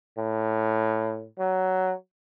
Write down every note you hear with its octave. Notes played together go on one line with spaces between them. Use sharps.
A2
F#3